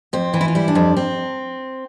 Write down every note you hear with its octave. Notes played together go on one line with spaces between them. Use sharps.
F2 C4
E3
E4
F4
G3 E4
D4
F2
C4